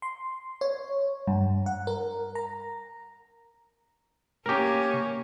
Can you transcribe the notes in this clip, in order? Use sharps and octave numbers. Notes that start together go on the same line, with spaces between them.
C6
C#5
G2
F#5
A#4
A#5
A#3 C#4 G4 A#4